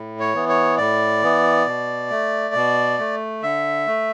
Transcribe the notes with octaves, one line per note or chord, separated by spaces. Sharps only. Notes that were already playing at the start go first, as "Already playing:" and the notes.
Already playing: A2
C#5
E3 B3
C#5
A2 D5
E3 B3
B2
A3
B2
A3
D3 E5
A3